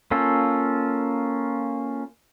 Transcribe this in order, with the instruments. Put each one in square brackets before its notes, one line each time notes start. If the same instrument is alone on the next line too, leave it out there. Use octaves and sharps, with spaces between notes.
[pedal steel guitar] A#3 C#4 F4 A4